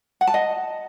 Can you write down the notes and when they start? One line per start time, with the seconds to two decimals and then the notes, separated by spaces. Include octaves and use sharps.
0.21 F#5
0.27 A5
0.34 D#5